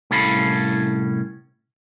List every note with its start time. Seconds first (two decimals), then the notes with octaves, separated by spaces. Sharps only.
0.11 C2 A2 C#4 A4 F5 B5